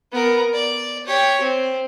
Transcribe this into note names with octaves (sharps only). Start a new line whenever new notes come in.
B3 A#4
D5
G4 C#5
C4